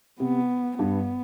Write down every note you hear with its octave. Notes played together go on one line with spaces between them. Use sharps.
C3 B3
G2 B3